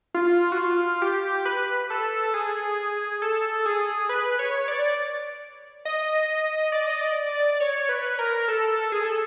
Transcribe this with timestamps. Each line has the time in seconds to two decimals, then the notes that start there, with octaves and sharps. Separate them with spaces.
0.14 F4
0.52 F#4
0.59 F4
1.02 G4
1.45 B4
1.90 A4
2.34 G#4
3.22 A4
3.66 G#4
4.09 B4
4.39 C#5
4.68 D5
5.85 D#5
6.72 D5
6.87 D#5
7.01 D5
7.56 D5
7.60 C#5
7.89 B4
8.19 A#4
8.48 A4
8.92 G#4
9.04 A4